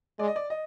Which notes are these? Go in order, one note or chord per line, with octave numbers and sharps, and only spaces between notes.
G#3 D5
D#5
D5
D#5